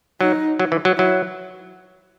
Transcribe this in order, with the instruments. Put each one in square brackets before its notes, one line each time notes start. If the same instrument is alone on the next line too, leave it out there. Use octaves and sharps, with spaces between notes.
[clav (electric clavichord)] F#3 [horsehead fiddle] D#4
[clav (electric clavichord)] F#3
E3
F#3
[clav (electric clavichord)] F#3 [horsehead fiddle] E4